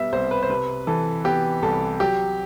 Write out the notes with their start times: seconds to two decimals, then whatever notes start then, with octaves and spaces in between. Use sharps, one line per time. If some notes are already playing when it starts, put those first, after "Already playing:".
Already playing: B2 G3 B3 E5
0.12 C2 C5
0.31 B4
0.43 C5
0.50 C3 B4
0.87 E3 A4
1.25 B3 G4
1.63 C2 A4
2.00 F#3 G4